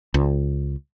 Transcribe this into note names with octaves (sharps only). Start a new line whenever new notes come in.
C#2